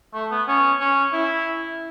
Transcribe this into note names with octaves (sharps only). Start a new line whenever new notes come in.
A3
B3
C#4
C#4
E4